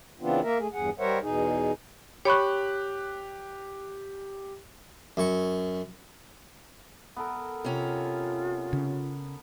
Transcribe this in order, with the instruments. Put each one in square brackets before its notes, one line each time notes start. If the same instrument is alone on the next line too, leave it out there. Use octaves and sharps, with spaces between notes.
[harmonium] C#3 E3 B3 C4 D4 F4
A#3 A#4 E5
A3 G#4
E2 G2 G#4 F#5
G3 A#4 C5 C#5 E5 F#5
E2 B2 D#4 G#4
[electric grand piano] G4 F#6 [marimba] C#5 B5 C#6
[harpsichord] F#2 C#6
[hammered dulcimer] B3 A4 A#4
[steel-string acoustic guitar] C3 C#4 [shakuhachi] F4
[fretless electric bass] C#3